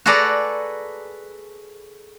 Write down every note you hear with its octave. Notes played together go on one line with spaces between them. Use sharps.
F#4 G#4 A4 B4 D5 A#5